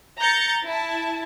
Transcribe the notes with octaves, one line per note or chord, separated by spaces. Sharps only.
A#5 G6 A6 C#7
E4 A5